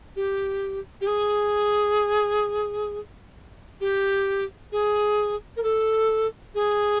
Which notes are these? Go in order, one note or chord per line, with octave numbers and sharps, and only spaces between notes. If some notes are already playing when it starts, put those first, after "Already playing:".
G4
G4
G#4
G4
G#4
A#4
A4
G#4